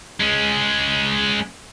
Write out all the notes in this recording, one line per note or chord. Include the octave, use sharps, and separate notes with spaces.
G#3 C#4